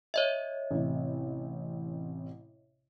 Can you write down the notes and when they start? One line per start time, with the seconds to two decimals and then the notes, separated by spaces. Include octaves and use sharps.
0.14 C#5 D#5 E5
0.71 A1 C3